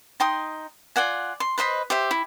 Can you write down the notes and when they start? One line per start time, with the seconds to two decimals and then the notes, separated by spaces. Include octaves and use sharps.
0.20 D#4 G5 C6 D#6
0.96 F4 D5 F#5 G#5
1.40 C6
1.58 B4 C5 D#5 B5
1.90 G4 C5 E5
2.11 E4